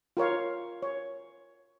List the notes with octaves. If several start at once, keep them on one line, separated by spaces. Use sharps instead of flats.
F4 A#4 C#5 F5
C#5